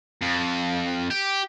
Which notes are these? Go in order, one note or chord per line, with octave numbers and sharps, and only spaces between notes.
F2
G4